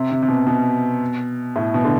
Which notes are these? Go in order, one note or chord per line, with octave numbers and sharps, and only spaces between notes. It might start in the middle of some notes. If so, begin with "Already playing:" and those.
Already playing: C3
C3
C3
B2
B2
A2
B2
D3